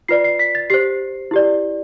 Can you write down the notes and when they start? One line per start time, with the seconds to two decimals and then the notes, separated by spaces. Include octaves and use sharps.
0.08 F4 B4 D5 C7
0.24 C7
0.39 B6
0.55 A6
0.70 G4 C5 C7
1.31 E4 G4 D5